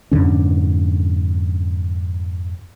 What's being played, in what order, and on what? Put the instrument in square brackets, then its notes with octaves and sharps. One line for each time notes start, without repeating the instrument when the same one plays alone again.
[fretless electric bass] F2 G#2 D3 C#4